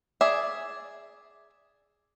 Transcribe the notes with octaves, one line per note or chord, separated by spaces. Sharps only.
G#4 D5 E5